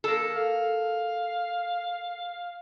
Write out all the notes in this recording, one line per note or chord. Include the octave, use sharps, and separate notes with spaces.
A#3 A4
F5